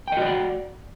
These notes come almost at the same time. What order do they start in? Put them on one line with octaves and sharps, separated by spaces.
G5 D#5 F#4 D5 F#5